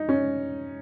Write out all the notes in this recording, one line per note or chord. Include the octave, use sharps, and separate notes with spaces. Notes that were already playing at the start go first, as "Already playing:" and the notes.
Already playing: D#4
C#4